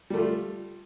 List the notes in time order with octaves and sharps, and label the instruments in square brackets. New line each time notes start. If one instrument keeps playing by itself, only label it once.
[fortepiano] G3
A3
F4